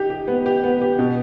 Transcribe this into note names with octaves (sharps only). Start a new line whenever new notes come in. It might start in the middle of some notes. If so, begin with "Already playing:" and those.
Already playing: D#4 G4
G4
B3
G4
B3
G4
B2